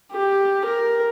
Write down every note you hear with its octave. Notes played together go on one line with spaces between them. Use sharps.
G4
A#4